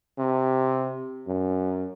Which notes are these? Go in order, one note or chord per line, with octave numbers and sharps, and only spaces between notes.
C3
F#2